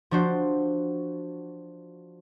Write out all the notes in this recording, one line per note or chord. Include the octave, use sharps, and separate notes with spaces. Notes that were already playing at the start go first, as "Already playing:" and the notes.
F3 D4 F#4 C5